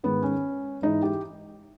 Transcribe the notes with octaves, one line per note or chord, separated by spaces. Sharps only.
G#2 D#3 B3
C#4
G#2 E3 D#4
G4